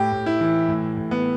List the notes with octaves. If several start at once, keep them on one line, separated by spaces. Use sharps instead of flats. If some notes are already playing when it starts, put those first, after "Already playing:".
Already playing: A2 G4
A2
E4
E3
A2
A2
B3